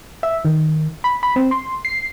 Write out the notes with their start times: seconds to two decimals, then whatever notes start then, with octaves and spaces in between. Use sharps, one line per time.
0.23 E5
0.45 D#3
1.04 B5
1.23 B5
1.36 C4
1.51 C6
1.85 C7